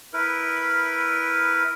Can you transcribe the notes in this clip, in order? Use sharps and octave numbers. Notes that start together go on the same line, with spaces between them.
E4 A#4 B4